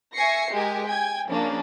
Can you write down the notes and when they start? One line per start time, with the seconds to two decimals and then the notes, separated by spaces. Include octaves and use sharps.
0.15 E5 G#5 C#6 A#6 C7 C#7
0.51 G#3 G4 A#4 G#5
0.83 G5 G#5 G#6
1.28 C#3 F3 A#3 C#4 D4